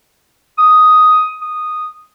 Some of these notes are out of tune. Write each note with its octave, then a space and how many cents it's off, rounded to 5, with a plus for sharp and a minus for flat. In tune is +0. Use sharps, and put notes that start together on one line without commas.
D#6 +5
D#6 -10